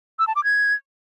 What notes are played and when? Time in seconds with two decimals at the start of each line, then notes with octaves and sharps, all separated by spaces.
0.19 E6
0.27 A5
0.36 D6
0.44 G#6